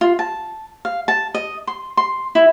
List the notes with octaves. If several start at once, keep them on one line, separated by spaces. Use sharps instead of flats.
F4
A5
F5
A5
D#5
C6
C6
E4